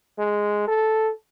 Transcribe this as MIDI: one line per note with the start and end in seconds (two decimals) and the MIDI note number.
0.18 0.63 56
0.68 1.11 69